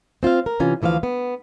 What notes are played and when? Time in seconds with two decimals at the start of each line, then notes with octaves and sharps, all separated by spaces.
0.23 C4 F4 C5 F5
0.46 A#4
0.60 C3 E3 C#4 F4
0.82 D2 E3 F3 D#5 F5
1.03 B3